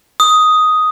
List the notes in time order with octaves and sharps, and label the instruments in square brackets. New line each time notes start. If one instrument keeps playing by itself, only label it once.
[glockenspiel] D#6